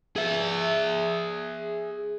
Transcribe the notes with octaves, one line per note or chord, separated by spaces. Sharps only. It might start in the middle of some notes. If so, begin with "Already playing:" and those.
G#4 E5